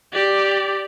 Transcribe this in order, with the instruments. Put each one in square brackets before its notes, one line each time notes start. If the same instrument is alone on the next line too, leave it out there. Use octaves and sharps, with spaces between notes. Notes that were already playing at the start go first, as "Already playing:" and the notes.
[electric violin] G4 D5